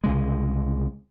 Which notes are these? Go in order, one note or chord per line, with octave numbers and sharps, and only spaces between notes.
C2 C#3 G#3